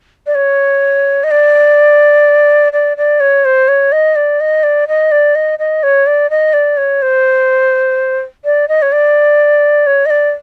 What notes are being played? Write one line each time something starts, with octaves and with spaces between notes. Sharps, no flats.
D5
C#5
D#5
D5
D5
D5
C#5
C5
C#5
D#5
D5
D#5
D5
D#5
D5
D#5
D#5
C#5
D5
D#5
D5
C#5
C5
D5
D#5
C#5
D5
C#5
D#5
D5